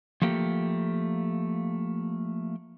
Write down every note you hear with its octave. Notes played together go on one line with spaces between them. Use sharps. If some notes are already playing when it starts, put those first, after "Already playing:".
F3 A3 A#3 G4